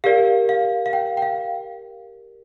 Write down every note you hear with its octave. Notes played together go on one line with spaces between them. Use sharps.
G4 A#4 D5 F5
F5
F5
G5
G5
F5